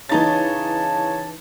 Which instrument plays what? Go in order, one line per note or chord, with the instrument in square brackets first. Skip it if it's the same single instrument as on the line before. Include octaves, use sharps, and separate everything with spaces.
[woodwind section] C#3 C#5 A5 [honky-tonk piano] E3 D#4 A6